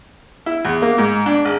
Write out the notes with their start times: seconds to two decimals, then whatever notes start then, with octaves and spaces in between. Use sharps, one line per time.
0.46 E4
0.65 E2
0.82 A#3
0.98 G#2
1.26 D4
1.45 G#1